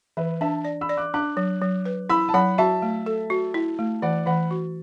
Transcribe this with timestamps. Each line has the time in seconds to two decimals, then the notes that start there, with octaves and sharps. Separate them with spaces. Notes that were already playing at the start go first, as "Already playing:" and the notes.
0.17 E3 B4 E5
0.41 D4 E5 A5
0.65 D5
0.81 B5 E6
0.89 D5
0.97 D6 F#6
1.14 D4 D6 F#6
1.37 F#3
1.62 F#3
1.85 B4
2.10 E4 B5 E6
2.29 A5
2.34 F#3 F#5 B5
2.58 F#4 E5 A5
2.82 A3
3.06 A4
3.30 F#4
3.54 E4
3.79 A3
4.02 E3 D5 F#5
4.26 E3 F#5 B5
4.51 F#4